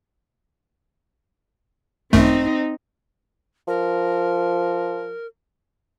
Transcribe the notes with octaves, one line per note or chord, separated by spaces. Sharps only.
G#1 F#2 A3 C4 D#4
F3 A#4